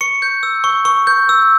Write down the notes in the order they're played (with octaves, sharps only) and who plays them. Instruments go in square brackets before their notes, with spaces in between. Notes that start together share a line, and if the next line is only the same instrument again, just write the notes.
[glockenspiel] C#6 C#7
G6
E6
C#6
C#6
G6
E6